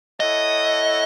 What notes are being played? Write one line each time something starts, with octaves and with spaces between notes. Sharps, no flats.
E4 A4 C#5 D#5 F#5 A5